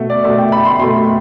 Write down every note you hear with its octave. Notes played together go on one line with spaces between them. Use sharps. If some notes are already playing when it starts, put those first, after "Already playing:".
Already playing: B2 A3 E5
D5
B2 A3 E5
G5
B5
C6
B2 A3 C6